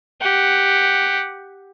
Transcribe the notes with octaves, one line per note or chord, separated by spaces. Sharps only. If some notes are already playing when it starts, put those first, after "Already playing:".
G4 F#5